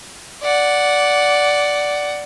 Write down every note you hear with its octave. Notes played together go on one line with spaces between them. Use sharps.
D5 F#5